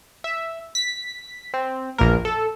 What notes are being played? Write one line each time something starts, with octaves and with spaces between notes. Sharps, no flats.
E5
B6
C4
A#1 E2 A#3 A#4
A4